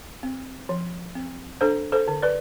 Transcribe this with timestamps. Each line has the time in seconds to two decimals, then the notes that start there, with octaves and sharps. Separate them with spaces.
0.23 C4
0.69 F3
1.15 C4
1.61 D4 A4 C5
1.92 A4 C5
2.08 D3
2.22 B4 D5